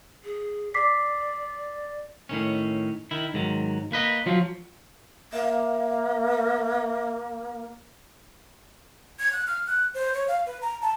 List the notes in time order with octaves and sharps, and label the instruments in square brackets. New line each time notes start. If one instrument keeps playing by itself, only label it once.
[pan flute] G#4
[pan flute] D5 [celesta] D6 B6 C7
[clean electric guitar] A2 D#3 C#4
D#3 E4
G#2 D#3 F#3
A#3 B4 D#5
F3 F#3 F4
[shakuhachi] A#3 [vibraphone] E5 F5
[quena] G#6
F#6
F6
F#6
C5
C#5
F5
B4
A#5
A5